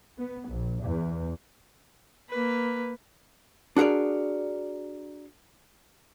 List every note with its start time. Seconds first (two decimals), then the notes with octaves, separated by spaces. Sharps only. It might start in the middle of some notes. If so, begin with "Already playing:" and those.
0.18 B3
0.48 A#1
0.81 E2
2.29 A#3 B4
3.76 D4 F#4 G#4 A#4 D5